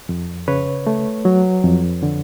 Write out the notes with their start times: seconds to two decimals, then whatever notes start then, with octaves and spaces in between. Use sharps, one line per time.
0.09 F2
0.48 C#3 B4 C#5
0.87 A3
1.25 F#3
1.64 F2
2.03 D3